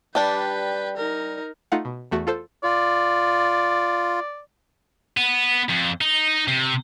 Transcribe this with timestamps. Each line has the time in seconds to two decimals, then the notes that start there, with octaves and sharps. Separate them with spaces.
0.15 G3 D4 G4 B4 G5
0.97 D#4 A#4
1.72 A3 D#4 F4 F5 F#5
1.85 B2
2.11 E2 A3 F#4
2.27 F4 A4 C5
2.64 F4 D5
5.17 B3
5.69 F2
6.01 D#4
6.48 C3